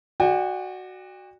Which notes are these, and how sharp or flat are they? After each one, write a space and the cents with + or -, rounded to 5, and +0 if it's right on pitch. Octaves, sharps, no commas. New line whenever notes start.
F#4 +0 D5 +25 G5 +40